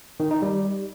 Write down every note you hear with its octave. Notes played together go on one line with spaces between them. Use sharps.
D#3
D#4
G3